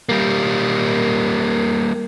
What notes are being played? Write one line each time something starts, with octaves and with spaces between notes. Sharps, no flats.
G3 A#3